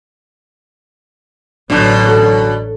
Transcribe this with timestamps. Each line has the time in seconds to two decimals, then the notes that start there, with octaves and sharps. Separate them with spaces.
1.70 A1 B2 D3 F#3 D4
2.08 A4